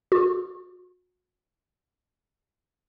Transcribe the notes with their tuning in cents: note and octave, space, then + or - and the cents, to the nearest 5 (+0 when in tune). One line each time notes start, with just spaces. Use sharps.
F#4 -35